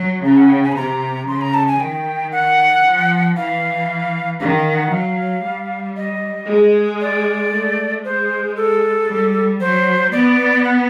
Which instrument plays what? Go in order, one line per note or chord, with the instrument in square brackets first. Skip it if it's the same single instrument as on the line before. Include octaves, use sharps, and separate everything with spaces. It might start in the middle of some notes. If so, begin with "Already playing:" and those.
Already playing: [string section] F#3
[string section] C#3 [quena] A#5
[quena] F#5
G5
G#5
B5
[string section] C3 [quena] A#5
[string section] C#3 [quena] C6
[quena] A#5
A5
G#5
[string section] D#3 [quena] G5
[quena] F#5
[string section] F3
[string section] E3 [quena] F5
[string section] D#3 [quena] F5
[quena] F5
F#5
[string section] F#3 [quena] F5
[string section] G3
[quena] D#5
[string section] G#3
[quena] D5
[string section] A3
[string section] G#3 [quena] C5
[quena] A4
[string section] G3
[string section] F#3 [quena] C5
[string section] B3 [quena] D5
[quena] F#5